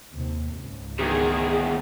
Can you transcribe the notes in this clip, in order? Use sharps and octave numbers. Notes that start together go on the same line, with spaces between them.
D#2 C3
C#2 G#2
E2 D#3 G#4